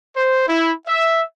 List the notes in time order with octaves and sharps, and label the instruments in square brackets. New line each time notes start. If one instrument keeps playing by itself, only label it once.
[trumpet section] C5
E4
E5